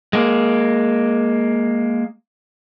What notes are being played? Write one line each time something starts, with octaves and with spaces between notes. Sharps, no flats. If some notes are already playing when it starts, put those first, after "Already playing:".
G#3 A#3